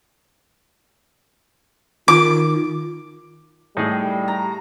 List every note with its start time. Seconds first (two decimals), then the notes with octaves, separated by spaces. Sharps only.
2.08 D#3 F4 D6
3.77 A2 G3 D#4 G#4
4.28 A#5